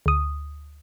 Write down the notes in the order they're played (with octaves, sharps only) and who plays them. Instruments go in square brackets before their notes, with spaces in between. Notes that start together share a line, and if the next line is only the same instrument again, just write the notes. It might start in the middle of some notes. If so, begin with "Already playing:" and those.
[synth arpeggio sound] D2 D#6